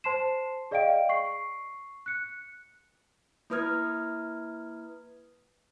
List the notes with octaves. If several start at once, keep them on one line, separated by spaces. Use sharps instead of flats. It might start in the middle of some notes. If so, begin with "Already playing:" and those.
C5 A5 C6 C7 E7
G#4 D5 D#5 F5 G5 D7
C#6 C7
F#6 C#7
A#3 E4 B4 D#6 F6 G#6